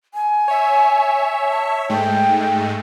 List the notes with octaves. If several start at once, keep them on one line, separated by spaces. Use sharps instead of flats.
G#5
C#5 E5
A5
G#2 G#3 A3 G5